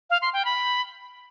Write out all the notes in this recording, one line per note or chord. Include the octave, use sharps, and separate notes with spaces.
F5
C6
G5
B5